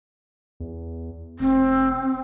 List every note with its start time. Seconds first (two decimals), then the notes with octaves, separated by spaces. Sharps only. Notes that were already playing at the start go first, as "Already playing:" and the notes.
0.60 E2
1.39 F1 C4